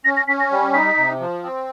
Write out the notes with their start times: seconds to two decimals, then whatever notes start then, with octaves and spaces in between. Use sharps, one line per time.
0.04 C#4 A#6
0.17 A#6
0.28 C#4 B6
0.40 A#6
0.51 G3
0.73 D#4 B6
0.97 C3
1.20 F3
1.43 C4